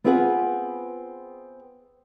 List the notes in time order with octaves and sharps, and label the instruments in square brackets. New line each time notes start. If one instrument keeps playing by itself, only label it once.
[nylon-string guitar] B3 C4 F4 G#4 B4 F#5